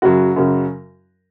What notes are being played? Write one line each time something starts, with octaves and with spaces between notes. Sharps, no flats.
F#2 C#3 F#3 F#4
F#2 C#3 F#3